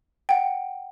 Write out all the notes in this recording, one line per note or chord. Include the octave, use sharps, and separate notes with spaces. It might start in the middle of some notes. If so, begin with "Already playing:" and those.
F#5 G5